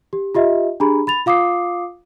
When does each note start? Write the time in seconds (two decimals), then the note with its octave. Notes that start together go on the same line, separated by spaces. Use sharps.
0.13 G4
0.35 F4 G4 D#5 E5
0.80 D4 G4 G#4 A#5 B5
1.07 B5 A6 F7
1.26 F4 F5 D6 D#6 C7